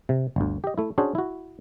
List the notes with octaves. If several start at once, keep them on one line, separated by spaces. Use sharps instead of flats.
C3
G1 D2
G4 D#5
A3 E4
C#4 D4 F#4 G#4 C5
E4 F#4